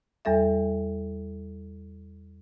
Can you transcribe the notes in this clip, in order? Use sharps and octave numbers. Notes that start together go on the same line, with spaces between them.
E2 G3 A4 E5